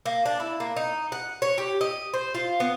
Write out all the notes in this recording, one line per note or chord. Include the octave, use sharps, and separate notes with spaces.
A#3
D4
E4
A#3
D#4
F#5
C#5
G4
D#5
C5
F4
B3